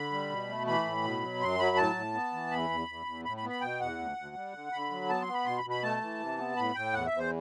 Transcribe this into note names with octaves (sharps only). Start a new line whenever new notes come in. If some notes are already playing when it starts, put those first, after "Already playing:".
Already playing: D3 B5
G3
B2
A3
E3 B5
A2
B2
F#3
F#2 C6
F#3 B5
A2 A5
A2
B3
E3
E2 B5
E2
E2
E2
A2 B5
B5
B3
B5
B2 G5
E2 F#5
D2
D2
G3
D3
D3 B5
F#3
B3 A5
C6
B3
B5
B2 C6
B5
B2
B5
A3 A5
E3
C3
B3
A2 B5
A2 G5
E2 F#5
E5
E2
C5